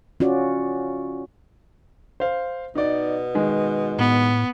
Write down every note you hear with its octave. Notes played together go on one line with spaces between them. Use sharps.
C#4 F4 F#4 D5
C5 F5
B2 D#4 D5
D#3 G#3
A2 B3